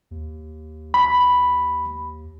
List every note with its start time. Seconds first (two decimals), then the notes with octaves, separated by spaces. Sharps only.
0.11 D#2
0.94 B5